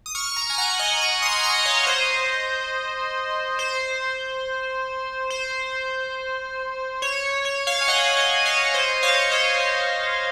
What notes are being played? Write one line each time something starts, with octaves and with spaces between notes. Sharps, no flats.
D#6
C#6 F6
A#5 C#6
G#5
F#5 A#5
D#5 F#5
A#5 C#6
C6 D#6
A#5 C#6
C#5 F5
C5 D#5
C5
C5
C#5
C#5
C#5 F5
G#5
D#5 F#5
D#5 F#5
C#5 F5
C5 D#5
C#5 F5
C5 D#5
C#5